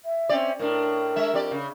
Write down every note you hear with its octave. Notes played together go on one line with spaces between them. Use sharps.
E5
C4 C#4 D5
A2 D4 A#4
G#3 E5
F2 G4 D5
C#3